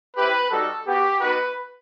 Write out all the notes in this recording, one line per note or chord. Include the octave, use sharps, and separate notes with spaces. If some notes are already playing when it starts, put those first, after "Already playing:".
C4 E4 G4 B4
G3 D#4 F#4 A4
B3 F#4 G4
B3 D#4 F#4 B4